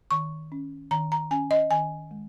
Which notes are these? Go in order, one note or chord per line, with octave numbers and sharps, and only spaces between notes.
D#3 C#6
C#4
D#3 A#5
A#5
C#4 G#5
D#5
D#3 G#5
G#3